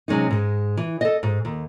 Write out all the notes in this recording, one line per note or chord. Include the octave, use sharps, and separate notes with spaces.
C3 F#3 G#3 C#4 D#4
G#2 G#3
E3
A4 D#5
G#2
D#2